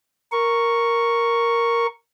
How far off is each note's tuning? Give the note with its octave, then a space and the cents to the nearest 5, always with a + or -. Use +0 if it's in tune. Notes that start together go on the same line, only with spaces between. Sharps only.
A#4 +0 C#6 +0